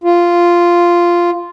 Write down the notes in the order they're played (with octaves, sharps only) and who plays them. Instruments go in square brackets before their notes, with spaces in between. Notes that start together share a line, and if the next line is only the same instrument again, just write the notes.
[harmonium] F4